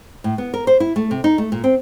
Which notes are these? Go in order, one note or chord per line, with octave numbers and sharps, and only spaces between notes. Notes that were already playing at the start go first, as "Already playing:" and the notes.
A2
B3
A#4
C5
E4
A3
C3
D#4
A3
A#2
C4